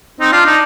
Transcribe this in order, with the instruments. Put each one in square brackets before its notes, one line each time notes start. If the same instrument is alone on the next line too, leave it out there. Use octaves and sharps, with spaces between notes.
[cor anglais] C4 [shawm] D#4
[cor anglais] D4 [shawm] F4
[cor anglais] D4 [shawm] D#4